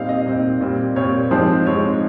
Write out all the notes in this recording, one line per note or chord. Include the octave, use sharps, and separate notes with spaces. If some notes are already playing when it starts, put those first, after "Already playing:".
Already playing: A#2 G3 C4 D#4 F5
D#5
A#2 G3 C4 D#4
A#2 G3 C4
A#2 G3 C4 C#5
G#2 F3 G#3 C4 C5
G#2 F3 G#3 C4 C#5